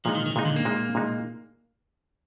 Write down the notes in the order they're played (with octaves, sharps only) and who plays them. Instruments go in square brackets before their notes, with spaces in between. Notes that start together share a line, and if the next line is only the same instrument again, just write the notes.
[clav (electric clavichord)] A#2 G#3 D#4 [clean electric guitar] F3
[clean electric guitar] D#3
D#3
[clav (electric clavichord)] A#2 G#3 D#4 [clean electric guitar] D#3
[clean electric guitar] D3
A#3
[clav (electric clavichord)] A#2 G#3 D#4
A#2 G#3 D#4